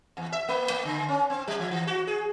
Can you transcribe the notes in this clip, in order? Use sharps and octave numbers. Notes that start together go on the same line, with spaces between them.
E2
E5
A#3
A#3
D3
C#4
C4
G3
F3
E3
F#4
G#4